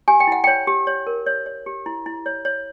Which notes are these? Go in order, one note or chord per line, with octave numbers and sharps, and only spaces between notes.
G4 G#5
G5
E4 F#5
C#5 G5
G4
C#5
A#4
C#5
C#5
G4
E4
E4
C#5
C#5